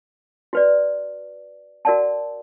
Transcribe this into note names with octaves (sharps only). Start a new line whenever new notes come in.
F#4 B4 D5
F#4 A#4 D5 F#5 A5